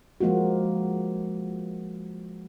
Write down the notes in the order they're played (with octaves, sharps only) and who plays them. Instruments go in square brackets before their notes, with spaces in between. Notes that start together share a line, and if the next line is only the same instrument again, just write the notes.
[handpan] F3 G#3 A#3 F4 F#4